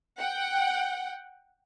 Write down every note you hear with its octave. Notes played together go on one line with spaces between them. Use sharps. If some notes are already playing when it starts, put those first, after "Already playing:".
F#5 G5